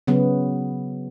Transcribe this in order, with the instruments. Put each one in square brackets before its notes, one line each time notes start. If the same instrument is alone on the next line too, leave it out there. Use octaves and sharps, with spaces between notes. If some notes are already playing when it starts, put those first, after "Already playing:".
[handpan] C#3 F#3 B3